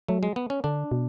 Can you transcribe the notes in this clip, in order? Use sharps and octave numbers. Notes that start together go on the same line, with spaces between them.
F#3 A3
G#3
B3
C#4
D3 D4
B2